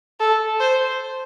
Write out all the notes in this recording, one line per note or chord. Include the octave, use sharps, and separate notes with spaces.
A4
C5